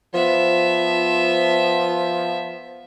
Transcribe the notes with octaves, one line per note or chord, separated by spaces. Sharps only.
F3 B3 E5